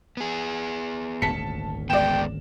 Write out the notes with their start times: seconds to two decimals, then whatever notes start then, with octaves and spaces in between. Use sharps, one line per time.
0.17 B3 G#4
1.22 D#1 G#1 D2 A5 B6 C#7
1.90 G#3 B3 D5 G5 E7